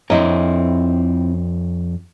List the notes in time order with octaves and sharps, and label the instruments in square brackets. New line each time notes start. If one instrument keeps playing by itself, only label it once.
[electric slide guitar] F2 C#5 A#5 [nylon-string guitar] C4 E4 D#5